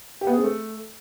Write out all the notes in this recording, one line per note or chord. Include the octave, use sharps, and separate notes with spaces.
G4
B3
G#4
C4
A3